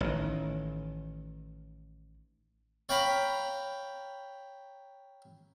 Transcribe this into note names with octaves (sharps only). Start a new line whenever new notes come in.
A1 D#3
C#5 F5 G5 A#5 B5